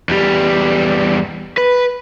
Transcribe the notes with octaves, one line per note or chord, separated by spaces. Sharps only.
E2 G3
B4